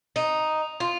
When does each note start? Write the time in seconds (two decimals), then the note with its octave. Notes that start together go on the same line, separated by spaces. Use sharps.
0.16 D#4
0.80 F4